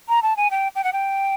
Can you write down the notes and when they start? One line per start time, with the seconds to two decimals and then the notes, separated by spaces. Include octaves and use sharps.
0.08 A#5
0.22 A5
0.37 G#5
0.51 G5
0.75 G5
0.84 F#5
0.93 G5